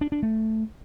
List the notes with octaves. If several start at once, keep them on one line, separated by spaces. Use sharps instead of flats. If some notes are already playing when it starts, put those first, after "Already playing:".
D4
D4
A3